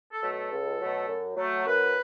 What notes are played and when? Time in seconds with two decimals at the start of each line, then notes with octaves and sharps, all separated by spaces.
0.12 A4
0.22 B2 F#3 A3
0.31 A4
0.51 C#2
0.80 B2 F#3 A3
1.08 F#2
1.36 F#3 A3
1.65 F#2 B4